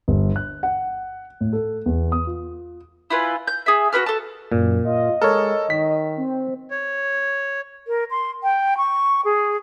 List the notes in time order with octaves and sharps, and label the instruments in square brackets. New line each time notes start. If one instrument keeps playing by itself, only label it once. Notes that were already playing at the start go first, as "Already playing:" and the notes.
[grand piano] G1
F#6
F#5
A2
A4
E2
D#6
F4
[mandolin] E4 F4 B4 G#5
G6
G#4 E5
F#4 A#4 B4 F6
A4 A5
[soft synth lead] F#2 [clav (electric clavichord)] A#2
[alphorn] F4 [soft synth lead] D#5
[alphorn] G#3 [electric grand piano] A4 [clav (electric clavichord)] A#4 C#5
[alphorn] D#3 [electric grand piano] B6
[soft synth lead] C4
[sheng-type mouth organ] C#5
[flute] A#4
C6
G5
C#6
G#4